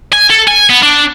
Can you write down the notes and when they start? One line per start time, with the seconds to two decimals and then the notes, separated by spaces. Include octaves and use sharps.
0.13 G#5
0.30 A4
0.48 G#5
0.69 B3
0.83 D4